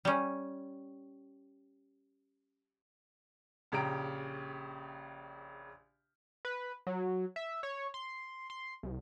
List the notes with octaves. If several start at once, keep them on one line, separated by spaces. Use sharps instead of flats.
G3 C#4
A#1 C#3 G4 A#5 D7
B4
F#3
E5
C#5
C6
C6
C2